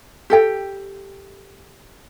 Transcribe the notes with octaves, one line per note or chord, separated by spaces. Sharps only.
G4 A4 G5